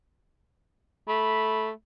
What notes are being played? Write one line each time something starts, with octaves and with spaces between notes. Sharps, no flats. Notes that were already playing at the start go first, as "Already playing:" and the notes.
A3 B5